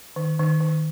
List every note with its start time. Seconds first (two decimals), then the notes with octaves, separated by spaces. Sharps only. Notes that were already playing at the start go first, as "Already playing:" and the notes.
0.16 D#3
0.39 D#3
0.61 D#3